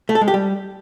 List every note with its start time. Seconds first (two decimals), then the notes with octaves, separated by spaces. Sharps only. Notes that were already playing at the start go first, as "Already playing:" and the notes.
0.09 A3
0.15 A4
0.21 G#3
0.28 G4
0.34 G3